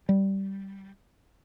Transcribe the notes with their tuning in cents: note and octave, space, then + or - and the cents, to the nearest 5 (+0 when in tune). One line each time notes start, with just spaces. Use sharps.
G3 -10